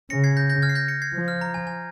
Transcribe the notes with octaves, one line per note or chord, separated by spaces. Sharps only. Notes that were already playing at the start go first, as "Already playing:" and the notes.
C#3 A#6 C#7
G#6 C7
G6 A#6
G6 A#6
F6 G#6
C7
G6 A#6
A#6 C#7
G#6 C7
F3
F6
A#5
G#5
G#5